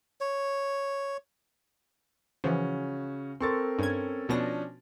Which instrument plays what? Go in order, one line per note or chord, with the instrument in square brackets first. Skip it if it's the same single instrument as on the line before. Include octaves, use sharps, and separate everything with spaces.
[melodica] C#5
[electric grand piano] C#3 [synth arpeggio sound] E3 F3 [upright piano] C#4 F#4
[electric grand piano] C4 A4 A#4 [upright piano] C6 C#6 A6
[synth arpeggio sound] G2 G#6 [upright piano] C#4
[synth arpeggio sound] B2 B3 A#6 [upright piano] F3 C#4 D4